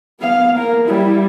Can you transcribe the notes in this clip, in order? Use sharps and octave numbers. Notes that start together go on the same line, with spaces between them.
B3 F5
A#3 A#4
G3 E4